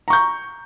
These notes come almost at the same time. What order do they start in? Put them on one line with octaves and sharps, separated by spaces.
A#5 C#6 G6